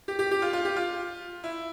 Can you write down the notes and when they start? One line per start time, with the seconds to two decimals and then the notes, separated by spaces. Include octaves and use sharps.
0.08 G4
0.19 G4
0.31 G4
0.42 F4
0.53 F4
0.65 G4
0.76 F4
1.44 E4